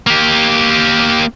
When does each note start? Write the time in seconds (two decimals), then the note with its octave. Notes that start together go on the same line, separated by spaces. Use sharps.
0.07 A#3 G4